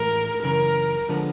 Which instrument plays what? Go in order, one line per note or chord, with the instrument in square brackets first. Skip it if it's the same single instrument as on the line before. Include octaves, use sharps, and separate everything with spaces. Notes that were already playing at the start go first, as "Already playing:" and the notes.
Already playing: [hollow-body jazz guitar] A2 E3 G#3 [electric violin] A#4
[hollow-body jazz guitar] F#2 C#3 E3 [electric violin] A#4
[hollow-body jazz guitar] D3 F3 G#3 B3